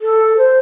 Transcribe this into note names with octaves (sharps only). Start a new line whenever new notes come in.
A4
C5